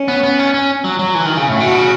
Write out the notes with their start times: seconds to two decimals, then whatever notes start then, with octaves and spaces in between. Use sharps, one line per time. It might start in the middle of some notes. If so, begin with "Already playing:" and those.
Already playing: C#4
0.08 B3
0.24 B3
0.39 C#4
0.54 C#4
0.84 F#3
0.99 F#3
1.15 E3
1.26 D#3
1.37 C#3
1.49 A2
1.59 B2 F#4
1.75 C#3